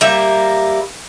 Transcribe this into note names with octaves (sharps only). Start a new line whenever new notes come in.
G3 A#3 E5